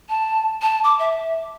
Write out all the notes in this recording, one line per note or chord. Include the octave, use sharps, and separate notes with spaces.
A5
A5
D6
E5